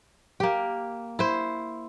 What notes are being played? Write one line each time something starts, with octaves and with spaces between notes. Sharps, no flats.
A#3 G4
E4 C5